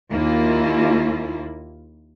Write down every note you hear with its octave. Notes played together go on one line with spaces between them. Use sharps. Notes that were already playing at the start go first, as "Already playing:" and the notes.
D#2 A#3 E4 F4